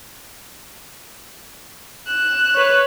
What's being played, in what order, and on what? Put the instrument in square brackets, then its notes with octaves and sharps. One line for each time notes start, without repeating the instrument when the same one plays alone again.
[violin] F#6 E7
[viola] B4 C#5